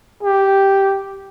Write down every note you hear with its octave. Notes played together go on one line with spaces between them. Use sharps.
G4